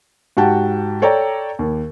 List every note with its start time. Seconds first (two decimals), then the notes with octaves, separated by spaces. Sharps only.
0.37 G#2 F#4 G4 F#5 G5 A5
1.02 A4 C#5 D5 G5 A#5
1.59 D#2